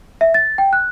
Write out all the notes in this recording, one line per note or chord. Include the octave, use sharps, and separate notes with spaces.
E5
A6
G5
F#6